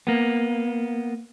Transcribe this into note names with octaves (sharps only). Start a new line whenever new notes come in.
A#3 B3